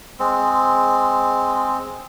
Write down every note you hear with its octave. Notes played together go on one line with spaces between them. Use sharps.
G#3 C4